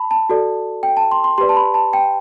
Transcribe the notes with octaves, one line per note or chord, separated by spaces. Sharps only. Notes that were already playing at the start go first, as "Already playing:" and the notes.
Already playing: A5 B5
A5
F#4 A4 D5
G5
A5
C6
C6
G4 B4 D5 C6
A5
B5
A5
G5